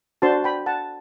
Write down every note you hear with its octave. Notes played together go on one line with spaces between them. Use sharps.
D4 F#4 C5 A5 C6
G5 B5
F#5 A5